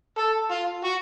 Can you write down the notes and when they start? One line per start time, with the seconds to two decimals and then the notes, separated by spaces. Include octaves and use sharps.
0.18 A4
0.51 F4
0.84 F#4